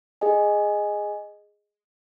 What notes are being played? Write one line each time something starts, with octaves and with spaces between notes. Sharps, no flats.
G#4 D#5 G#5